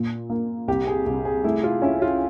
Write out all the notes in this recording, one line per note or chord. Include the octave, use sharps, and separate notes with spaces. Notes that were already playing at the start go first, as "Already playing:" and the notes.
Already playing: A#2
A#3
C2 G4
G#4
C2
G#4
A3 E4
F4
C#4 E4
F4